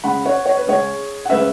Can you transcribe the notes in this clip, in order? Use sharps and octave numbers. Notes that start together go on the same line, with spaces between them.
C#3 G#3 C#4 F#5 B5
C#5 F#5
C#5
B4
C#3 G#3 C#4 G#4 C#5
F#5
C#3 G#3 C#4 B4 E5